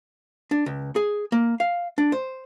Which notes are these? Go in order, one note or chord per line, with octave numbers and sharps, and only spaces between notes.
D4
C#2
G#4
A#3
F5
D4
C5